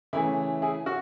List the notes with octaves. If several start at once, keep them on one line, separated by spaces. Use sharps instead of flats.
C#3 E3 A3 E4
E4 G#4
F#4